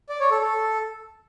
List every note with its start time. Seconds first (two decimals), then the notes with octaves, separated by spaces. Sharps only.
0.09 D5
0.20 C#5
0.31 A4
0.41 A4